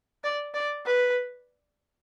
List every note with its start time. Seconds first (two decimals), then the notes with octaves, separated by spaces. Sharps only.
0.24 D5
0.54 D5
0.85 B4